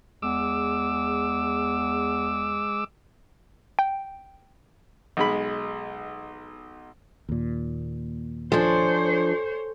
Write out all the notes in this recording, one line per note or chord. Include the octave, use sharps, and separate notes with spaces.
E2 G#3 D6 E6
G5
B1 G#3 B5
D#2 A#2
F3 D4 A4 C5 C#5 G#5